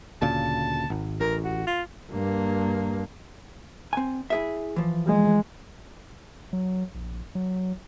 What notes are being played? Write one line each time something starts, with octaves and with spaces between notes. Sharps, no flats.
D2 A#2 C#3 A5
G#1
A1 A#4
F#4
F4
G2 A#3
C4 G#5
E4 G#4 E5
E3 F3
G#3
F#3
A#1
F#3